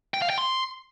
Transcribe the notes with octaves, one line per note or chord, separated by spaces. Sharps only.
G5
F5
G5
C6